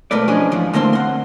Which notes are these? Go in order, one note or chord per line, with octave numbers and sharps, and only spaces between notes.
B1 A3 A#4 B4 D5
F3 C#4 D4 G#4 D#5
G#2 E3 F3
D3 A3 A#3 C4 B5 C6
F#5 C6